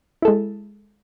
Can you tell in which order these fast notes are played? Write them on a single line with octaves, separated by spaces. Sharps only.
E4 A4 G#3